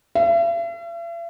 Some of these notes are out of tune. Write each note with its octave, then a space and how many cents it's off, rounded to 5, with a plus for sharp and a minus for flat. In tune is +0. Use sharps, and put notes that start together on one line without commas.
E5 +45